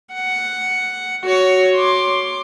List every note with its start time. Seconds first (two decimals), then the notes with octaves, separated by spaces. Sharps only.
0.13 F#5
1.24 F#4 C#5
1.76 C6 D6